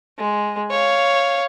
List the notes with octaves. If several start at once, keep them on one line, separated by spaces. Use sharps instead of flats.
G#3
C#5 F5